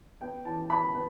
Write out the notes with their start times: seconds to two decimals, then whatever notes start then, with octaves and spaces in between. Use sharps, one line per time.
0.21 B3 G5
0.45 E3 A5
0.69 B3 B5
0.94 B3